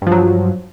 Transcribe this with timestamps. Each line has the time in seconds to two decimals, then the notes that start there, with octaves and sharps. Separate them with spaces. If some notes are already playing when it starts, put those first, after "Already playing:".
0.02 G2
0.07 F3
0.12 F#3